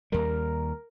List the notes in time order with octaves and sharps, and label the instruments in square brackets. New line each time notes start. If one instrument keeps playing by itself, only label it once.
[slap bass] D#2 G3 [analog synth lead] A#4